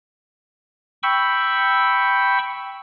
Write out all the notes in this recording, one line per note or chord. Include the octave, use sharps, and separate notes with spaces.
G5 B5 C#6 E6